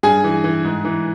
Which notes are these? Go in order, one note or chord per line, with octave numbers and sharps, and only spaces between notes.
G2 G#4 G#5
E3
E3
G#2
E3